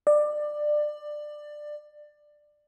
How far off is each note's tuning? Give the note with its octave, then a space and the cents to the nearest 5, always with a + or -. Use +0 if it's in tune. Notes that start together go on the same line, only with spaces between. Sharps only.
D5 +20